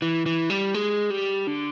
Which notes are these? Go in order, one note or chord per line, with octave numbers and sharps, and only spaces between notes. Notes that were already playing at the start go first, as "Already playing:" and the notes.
E3
E3
G3
G#3
G3
D3